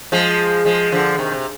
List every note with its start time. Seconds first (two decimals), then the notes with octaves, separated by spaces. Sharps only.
0.12 F3 G#3
0.65 F3 G#3
0.92 D3 F3
1.18 C3 D#3
1.32 C3